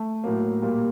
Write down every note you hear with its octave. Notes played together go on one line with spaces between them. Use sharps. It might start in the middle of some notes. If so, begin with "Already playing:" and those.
Already playing: A3
A2 F#3 A#3
A#2 G3 A#3